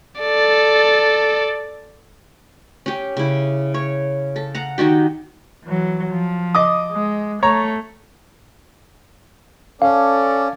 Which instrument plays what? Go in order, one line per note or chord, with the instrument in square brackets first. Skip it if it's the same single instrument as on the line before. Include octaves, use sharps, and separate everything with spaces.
[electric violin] A4 D5
[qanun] C#4 G4
C#3 E4
C#5
A4
F#5 A#5
D#3 D#4 F#4 G4
[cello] E3 F#3
F3
[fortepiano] D#5 D6 D#6
[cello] G#3
[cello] A3 [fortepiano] C#5 A#5
[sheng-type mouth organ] C#4 [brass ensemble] A4 D5 [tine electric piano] F5